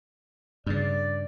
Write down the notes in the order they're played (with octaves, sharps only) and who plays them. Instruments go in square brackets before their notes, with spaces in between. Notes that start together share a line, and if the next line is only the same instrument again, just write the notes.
[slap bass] G2 C#3 [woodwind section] D5